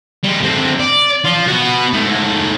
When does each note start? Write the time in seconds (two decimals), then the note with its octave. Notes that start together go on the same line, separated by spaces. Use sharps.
0.24 G3 G#3
0.42 D3 C4
0.80 D5
1.24 F3 F4
1.47 B3 F#4
1.93 G#2 A3